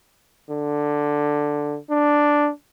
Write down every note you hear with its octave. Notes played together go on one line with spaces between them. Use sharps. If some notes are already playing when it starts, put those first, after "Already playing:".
D3
D4